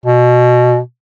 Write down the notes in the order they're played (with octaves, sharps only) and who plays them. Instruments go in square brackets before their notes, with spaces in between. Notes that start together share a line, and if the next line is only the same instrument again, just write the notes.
[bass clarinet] B2